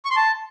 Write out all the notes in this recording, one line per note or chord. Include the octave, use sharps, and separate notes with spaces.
C#6
C6
A5